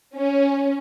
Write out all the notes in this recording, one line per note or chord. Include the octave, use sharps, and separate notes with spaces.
C#4